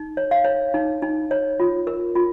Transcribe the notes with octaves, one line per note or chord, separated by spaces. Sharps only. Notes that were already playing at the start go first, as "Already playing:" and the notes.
Already playing: D#4
C#5
F5
C#5
D#4
D#4
C#5
F4
A#4
F4